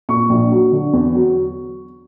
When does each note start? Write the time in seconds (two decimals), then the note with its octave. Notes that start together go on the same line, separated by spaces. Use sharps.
0.09 A#2 C#6
0.29 A#1
0.51 F#3
0.72 D3
0.93 E2
1.14 F#3